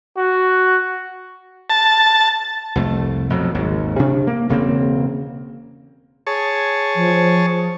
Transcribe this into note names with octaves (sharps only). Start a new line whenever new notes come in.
F#4
A5
C2 F2 A3
F2 B2 F#3
G#1 D#2
C3 D4
A#3
E1 C#3 A#3 C4
G#4 C#5 A5
F3